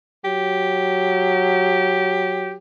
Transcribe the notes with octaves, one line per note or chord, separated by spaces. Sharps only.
F#3 G4